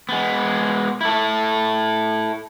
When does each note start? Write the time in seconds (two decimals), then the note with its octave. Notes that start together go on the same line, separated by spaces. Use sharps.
0.09 G#3 B3
1.01 E4 A4